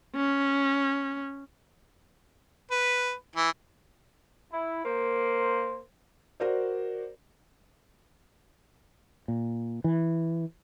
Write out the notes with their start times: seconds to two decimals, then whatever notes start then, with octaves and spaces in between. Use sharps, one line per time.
0.15 C#4
2.71 B4
3.36 E3
4.52 E4
4.85 A#3 C5
6.40 F#4 A#4 C5 D5
9.28 A#2
9.84 E3